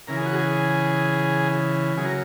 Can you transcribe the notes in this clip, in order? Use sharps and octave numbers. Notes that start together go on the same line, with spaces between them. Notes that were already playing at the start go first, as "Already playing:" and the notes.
C#3 E3 A#4
G#4
F#4
G#4
C#3 F#3 G#4
A#4